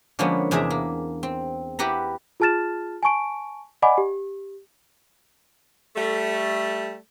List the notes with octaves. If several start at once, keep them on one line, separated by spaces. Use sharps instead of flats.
D3 F3 G#3 A#3 B3 C#4
E2 C3 D4 G#4 E5 A#5
A#3
C4
E4 G4 B4 F#5 A#5
F4 G#4 A5 F6 A6 E7
G#5 A5 C#6 D7
D5 D#5 F#5 G#5 B5 D6
G4
G3 A3